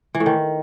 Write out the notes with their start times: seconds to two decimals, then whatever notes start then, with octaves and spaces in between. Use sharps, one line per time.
0.15 E3
0.20 A2
0.26 D#3